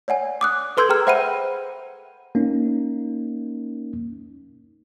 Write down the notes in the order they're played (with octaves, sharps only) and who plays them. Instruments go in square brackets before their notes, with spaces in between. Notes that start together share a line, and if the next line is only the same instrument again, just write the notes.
[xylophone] C#5 D5 F#5 G#5
D6 D#6 F#6
A4 B4 C6 E6 G6 G#6
G#4 G5 A#5 F6
C5 E5 F#5 G5 B5 D#7
[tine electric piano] A#3 C#4 D#4